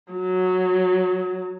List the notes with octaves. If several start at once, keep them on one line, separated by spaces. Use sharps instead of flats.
F#3